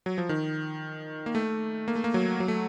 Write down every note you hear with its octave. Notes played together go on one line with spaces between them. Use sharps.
F#3
F3
D#3
A#3
A3
A#3
A3
A#3
F#3
F#3
A3